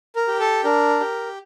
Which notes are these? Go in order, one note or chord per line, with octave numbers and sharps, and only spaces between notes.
A#4
G4
A4
D4 A#4
G4